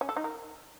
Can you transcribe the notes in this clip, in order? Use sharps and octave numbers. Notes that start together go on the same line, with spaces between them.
C#4
A4
D#4
A#4